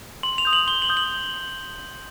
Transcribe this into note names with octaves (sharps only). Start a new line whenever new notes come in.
C6 F#7
F7
D#6 G6
F#7
C6 G7
F#7
D#6 G6
F#7